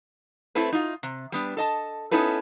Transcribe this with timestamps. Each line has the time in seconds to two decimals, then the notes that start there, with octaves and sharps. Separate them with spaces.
0.55 A3 C4 E4 A4 B4
0.72 D#4 F4
1.03 C3
1.32 G3 B3 D4
1.57 A4 D#5 A5
2.11 B3 C#4 D#4 E4 A4 B4